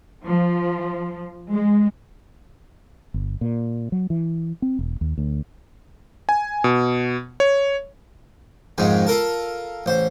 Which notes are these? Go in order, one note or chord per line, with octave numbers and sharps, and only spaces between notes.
F3
G#3
G1
A#2
F#3
E3
C4
E1
D#2
D2
G#5
B2
C#5
F2 G#2 D#3 G#3
F4 A4 A#4 A5
A1 C5